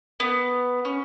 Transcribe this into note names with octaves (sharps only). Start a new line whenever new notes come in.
B3
C#4